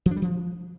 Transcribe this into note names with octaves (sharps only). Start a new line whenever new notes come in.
F3
D4
G3
F3